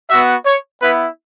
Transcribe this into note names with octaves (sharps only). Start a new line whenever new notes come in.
B3 F#4 E5
C#5
B3 E4 B4